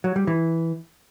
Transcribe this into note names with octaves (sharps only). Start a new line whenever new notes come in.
F#3
G3
E3